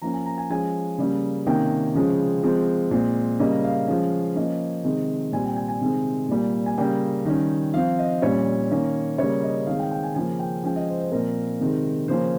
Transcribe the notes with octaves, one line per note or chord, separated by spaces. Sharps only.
F3 A#3 C#4 A#5
G#5
A#5
G#5
F3 G#3 C#4 G#5
C#3 G3 A#3 C#4
C3 D#3 A#3 C#4 G5
C#3 F3 G#3 C#4
F3 G#3 C4
A#2 G#3 C4
C#3 G3 A#3 C#4 D#5
F5
F3 G#3 C#4
F3 A#3 C#4 D#5
C3 D#3 G#3 C4
A#2 G3 C4 G#5
G5
G#5
G#5
C3 D#3 G#3 C4
A#2 G3 A#3
G#5
C#3 G3 A#3 G5
D#3 G3 C#4
F3 C4 F5
D#5
A#2 G3 C#4 C#5
D#3 A#3 C#4
C#3 G3 A#3 C#5
D#5
D#3 G#3 C4 F5
G5
G5
G#5
C#3 F3 A#3 C#4 G#5
G5
F3 G#3 C#4 G5
D#5
C5
C5
A#2 F3 C4 A#4
C3 D#3 G#3 C4
C#3 F3 A#3 C#4 C5